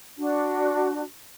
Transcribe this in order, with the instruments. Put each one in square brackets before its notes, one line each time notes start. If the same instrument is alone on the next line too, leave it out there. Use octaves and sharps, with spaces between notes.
[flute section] D4 F#4